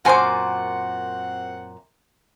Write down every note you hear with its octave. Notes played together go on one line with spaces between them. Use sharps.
F#2 A#2 C4 F#4 C5 F#5 G#5 D6